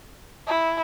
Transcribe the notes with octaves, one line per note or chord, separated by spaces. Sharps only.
E4